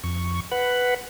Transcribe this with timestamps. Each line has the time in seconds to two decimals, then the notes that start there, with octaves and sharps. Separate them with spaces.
0.04 F2 C#6
0.51 B4 F#5 B5